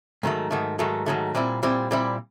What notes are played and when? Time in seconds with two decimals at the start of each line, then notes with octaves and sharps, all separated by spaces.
0.23 G#2 D#3 F#3 A3
0.51 G#2 D#3 F#3 A3
0.79 G#2 D#3 F#3 A3
1.06 G#2 D#3 F#3 A3
1.35 A#2 G3 C4 E4
1.63 A#2 G3 C4 E4
1.91 A#2 G3 C4 E4